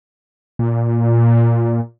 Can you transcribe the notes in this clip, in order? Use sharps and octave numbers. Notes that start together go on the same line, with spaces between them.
A#2